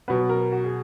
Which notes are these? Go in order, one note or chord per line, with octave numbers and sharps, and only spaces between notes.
B2 F#3 B3 B4
A#4
F#4
G#4